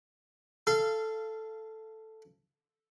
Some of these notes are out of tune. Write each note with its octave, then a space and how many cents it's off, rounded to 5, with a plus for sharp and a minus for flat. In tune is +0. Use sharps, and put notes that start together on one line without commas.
A4 +0 F5 -25